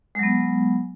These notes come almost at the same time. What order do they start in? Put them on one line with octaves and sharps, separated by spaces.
G#3 F#3 B3